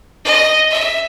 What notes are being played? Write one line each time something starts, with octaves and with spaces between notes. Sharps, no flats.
D#5
E5